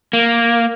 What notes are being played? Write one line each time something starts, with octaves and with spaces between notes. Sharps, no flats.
A#3